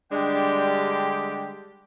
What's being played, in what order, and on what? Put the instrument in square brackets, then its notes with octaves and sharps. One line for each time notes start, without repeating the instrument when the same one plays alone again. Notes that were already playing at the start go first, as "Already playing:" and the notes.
[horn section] D3 G3 G#3 D4 G4 G5